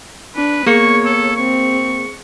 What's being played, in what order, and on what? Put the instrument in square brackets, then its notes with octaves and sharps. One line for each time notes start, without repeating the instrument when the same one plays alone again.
[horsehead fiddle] D4 [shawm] B4
[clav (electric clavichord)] A#3 [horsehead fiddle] B3 C#5 [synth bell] G#4 C#7 [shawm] C#6
[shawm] A4
[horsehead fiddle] C4 [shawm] C#6